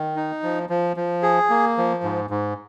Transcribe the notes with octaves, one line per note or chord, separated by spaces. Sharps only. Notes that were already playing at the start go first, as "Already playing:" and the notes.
Already playing: D#3
D#4
F3
F3
F3
G#4
A#3
F3
G#2
G#2